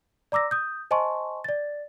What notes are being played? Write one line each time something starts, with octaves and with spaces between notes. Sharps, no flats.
D5 A#5 D6 E6 A#6
D#6 G6
C5 D#5 G#5 A5 C6 C#6
D5 A6